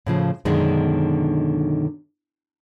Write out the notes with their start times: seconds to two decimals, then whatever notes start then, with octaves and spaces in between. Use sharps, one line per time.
0.06 A2 C#3 F3
0.45 F#2 B2 D3 D#3 G#3